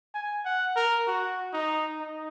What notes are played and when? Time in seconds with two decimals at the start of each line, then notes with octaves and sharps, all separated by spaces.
0.14 G#5
0.45 F#5
0.76 A#4
1.08 F#4
1.53 D#4
2.00 D#4